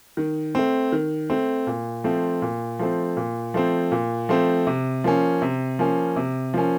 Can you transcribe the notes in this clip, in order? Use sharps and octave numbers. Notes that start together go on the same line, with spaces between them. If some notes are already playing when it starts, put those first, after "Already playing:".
D#3
A3 C4
D#3
A3 C4
A#2
F3 A3 C4
A#2
F3 A3 C4
A#2
F3 A3 C4
A#2
F3 A3 C4
C3
F3 A#3 C#4
C3
F3 A#3 C#4
C3
F3 A#3 C#4